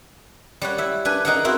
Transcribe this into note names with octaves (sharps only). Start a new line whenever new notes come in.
G3 C#5 F#5
E4 E5
D4 B4 G#5
D#4 G#4 A#4 E5 F#5
C4 E4 F#4 A#4